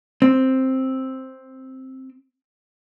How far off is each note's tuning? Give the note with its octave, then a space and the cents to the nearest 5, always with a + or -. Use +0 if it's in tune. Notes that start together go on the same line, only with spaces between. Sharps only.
C4 +5